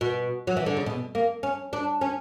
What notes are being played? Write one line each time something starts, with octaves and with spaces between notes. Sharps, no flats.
B2
F#3
E3
D3
C#3
B2
A#3
C#4
D4
C#4